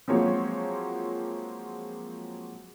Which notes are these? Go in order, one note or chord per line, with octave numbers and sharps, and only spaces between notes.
F3 F#3 G#3 A#3 C4 C#5